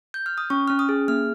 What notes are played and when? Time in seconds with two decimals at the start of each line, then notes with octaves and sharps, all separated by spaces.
0.14 G6
0.26 F6
0.38 D#6
0.50 C#4 C#6
0.68 C#4 F6
0.79 D#6
0.89 G#4
1.08 A#3 F6